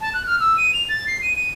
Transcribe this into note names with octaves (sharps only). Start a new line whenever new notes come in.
A5
F#6
F6
E6
D#7
F7
A6
C7
D#7
D#7